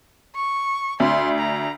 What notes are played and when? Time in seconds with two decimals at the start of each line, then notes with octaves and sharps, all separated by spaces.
0.36 C#6
1.00 D2 C6
1.38 A#5